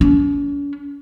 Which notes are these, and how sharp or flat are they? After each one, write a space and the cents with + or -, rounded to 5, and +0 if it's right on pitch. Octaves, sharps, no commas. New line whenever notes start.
C#4 +45